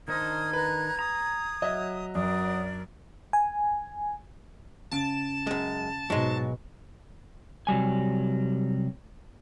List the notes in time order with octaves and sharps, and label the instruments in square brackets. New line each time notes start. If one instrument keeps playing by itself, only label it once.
[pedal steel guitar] D#3 D4 D#4 [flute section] C5 D#6 F6 [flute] G#6
[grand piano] B4 [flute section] A#5 F#6
[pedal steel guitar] A#5 [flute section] D#6
[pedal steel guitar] F#3 [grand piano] D#5 E5
[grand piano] F#2 [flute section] D4 A#4 D5 [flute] D#6
[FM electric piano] G#5
[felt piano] C#3 D7 [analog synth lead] A5
[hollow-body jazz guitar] F#2 G#3
[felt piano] G#2 [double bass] B2 [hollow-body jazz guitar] F#3 G#3
[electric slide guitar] C3 F#3 G3 G#5